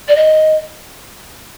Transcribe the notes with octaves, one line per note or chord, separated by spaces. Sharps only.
D5
D#5